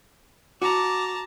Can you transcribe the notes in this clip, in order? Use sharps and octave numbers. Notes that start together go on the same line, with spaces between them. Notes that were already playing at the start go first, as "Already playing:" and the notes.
F#4 A5 A#5 D6